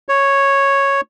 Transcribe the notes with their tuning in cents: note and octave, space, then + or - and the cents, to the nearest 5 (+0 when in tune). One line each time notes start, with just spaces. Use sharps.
C#5 -5